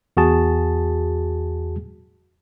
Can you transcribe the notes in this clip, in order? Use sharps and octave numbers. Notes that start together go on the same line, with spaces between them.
E2 F#4 G#4 A5